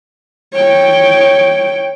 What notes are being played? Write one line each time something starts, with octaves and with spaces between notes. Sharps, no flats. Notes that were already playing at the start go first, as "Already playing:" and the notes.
C#5 G5